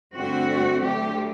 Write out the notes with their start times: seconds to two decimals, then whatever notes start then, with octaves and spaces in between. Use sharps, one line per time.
0.15 G2 D3 A3 C4 F#4
0.83 D2 D3 F#3 A3 G4